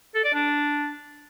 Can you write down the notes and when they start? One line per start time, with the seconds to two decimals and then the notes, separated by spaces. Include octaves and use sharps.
0.15 A4
0.24 D5
0.34 D4